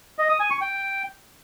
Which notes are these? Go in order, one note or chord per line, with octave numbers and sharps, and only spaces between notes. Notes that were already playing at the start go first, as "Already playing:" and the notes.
D#5
D#6
G#5
C#6
G5